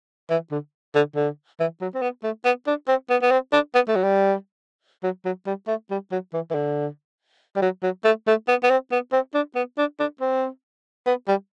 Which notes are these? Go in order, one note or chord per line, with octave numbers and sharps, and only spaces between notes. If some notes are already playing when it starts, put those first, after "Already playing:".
E3
D3
D3
D3
E3
F#3
C4
B3
A3
B3
D4
C4
B3
B3
C4
D4
B3
A3
F#3
G3
F#3
F#3
G3
A3
G3
F#3
E3
E3
D3
G3
F#3
F#3
A3
A3
B3
B3
C4
B3
C4
D4
B3
D4
D4
C4
B3
G3